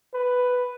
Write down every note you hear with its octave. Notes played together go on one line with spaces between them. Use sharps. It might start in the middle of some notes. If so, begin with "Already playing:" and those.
B4